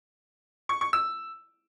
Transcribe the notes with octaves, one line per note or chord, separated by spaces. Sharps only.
C#6
C#6
E6